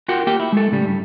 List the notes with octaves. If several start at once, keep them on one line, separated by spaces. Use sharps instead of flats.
F4 F#4 A#4 F#5 G5
A#3 G4 G5
E4
G#3 A4
A2 C#3 G3
G2